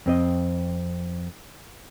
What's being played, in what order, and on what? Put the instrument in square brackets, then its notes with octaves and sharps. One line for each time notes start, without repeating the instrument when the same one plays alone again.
[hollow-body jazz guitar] F2 C4 D#5